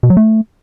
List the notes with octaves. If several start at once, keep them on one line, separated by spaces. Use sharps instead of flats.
B2
F#3
A3